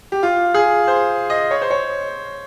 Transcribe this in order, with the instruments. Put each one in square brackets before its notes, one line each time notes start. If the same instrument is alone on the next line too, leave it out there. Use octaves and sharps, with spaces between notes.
[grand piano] G4
F4
G#4
C5
D#5
C#5
C5
C#5